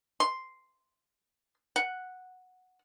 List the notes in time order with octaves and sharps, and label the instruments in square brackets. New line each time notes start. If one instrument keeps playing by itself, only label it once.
[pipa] C6
F#5